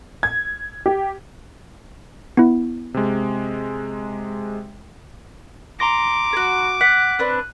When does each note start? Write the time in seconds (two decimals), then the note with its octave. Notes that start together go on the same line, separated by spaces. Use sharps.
0.23 G#6
0.86 G4
2.37 B3 E4
2.94 C3 G#3
5.80 A#5 C6 D6 A#6
6.33 F#4 G#4
6.81 F#5 F#6 B6
7.19 C4 D4 B4